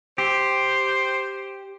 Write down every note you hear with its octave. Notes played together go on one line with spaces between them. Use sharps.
G4 C5